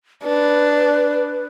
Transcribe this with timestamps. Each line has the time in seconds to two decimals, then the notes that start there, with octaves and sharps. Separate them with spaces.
0.24 D4 B4